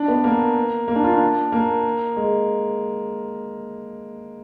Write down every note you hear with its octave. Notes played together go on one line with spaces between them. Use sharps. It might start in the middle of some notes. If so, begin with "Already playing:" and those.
Already playing: D4
B3
A#3
A#3
D4
F4
D4
A#3
G#3